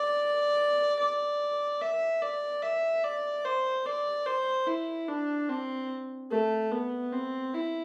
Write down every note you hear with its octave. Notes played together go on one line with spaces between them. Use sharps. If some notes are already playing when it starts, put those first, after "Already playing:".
Already playing: D5
D5
E5
D5
E5
D5
C5
D5
C5
E4
D4
C4
A3
B3
C4
E4